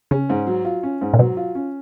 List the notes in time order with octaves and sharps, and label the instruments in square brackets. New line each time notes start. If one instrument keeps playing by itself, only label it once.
[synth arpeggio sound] C#3 [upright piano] C#4
[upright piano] G#2
F#3
F4
C#4
G#2
[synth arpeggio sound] A#2
[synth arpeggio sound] B2 [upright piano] F#3
[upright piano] F4
C#4